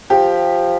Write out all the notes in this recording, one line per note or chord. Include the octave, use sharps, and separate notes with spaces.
F3 G4